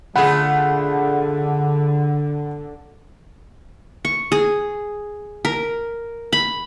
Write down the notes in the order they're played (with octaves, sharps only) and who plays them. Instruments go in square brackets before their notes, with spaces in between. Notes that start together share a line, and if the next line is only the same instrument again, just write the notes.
[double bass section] D3 [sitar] A3 F4 G#4 [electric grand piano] F#5 B5
[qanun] C#6
G#4
A#4
B5